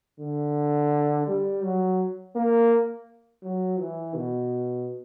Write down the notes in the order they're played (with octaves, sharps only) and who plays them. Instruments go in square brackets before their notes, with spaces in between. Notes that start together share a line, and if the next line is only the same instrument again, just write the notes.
[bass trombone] D3
G3
F#3
A#3
F#3
E3
B2